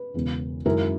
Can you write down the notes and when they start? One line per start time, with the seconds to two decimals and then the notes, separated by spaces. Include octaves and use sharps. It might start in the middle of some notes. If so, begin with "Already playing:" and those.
Already playing: B4
0.14 E1 E2 C#3
0.65 F#2 D#3 G#3 C#4 E4 A#4